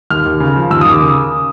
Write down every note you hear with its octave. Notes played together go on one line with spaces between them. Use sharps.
D#2 F6
D#2
C#3
F3
D#2 E6
D#2 D#6
D6
C#3